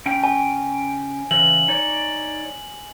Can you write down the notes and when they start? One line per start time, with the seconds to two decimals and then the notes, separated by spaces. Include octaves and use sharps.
0.06 C#3 C#4 G5
0.24 G#5
1.31 C#3 E3 F#7
1.68 D#4 C#5 D5